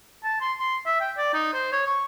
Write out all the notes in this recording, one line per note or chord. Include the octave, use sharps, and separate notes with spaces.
A5
C6
C6
E5
G5
D5
D#4
C5
C#5
C#6